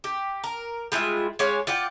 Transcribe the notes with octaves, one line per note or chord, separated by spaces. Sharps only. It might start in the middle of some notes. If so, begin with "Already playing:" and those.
G4
A#4
G3 G#3 F4 E5
G#3 G4 C#5 F5
F4 D5 F#5 G5